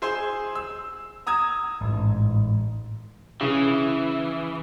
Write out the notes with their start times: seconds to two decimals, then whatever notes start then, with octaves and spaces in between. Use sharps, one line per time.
0.02 G#4 C5 G#5 C6 E6
0.55 E6
1.27 A#5 D#6 E6 G#6
1.81 A1 G#2
3.41 C#3 E3